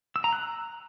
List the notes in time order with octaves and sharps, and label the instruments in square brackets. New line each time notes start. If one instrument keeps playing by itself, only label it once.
[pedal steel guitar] E6
A#5
F#6